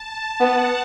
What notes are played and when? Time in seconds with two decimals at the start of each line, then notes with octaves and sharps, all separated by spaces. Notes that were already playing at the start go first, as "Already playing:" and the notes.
Already playing: A5
0.11 A5
0.40 B3 F#5